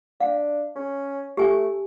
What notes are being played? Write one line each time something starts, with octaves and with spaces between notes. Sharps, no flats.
D4 F5
C#4
A3 G4 G#5